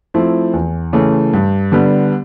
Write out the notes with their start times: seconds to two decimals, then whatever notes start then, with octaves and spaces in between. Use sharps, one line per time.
0.14 F3 A3 C4 E4
0.53 E2
0.93 C#3 E3 A3
1.33 G2
1.72 D3 G3 B3